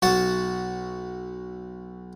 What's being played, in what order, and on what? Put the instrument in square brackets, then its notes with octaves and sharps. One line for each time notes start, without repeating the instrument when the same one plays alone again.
[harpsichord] B1 F#4 F#5 A5